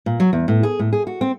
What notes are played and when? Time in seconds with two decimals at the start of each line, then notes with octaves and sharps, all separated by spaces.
0.06 A#2
0.20 F#3
0.33 E2
0.48 A2
0.63 G#4
0.79 A2
0.93 G#4
1.07 F#4
1.21 C4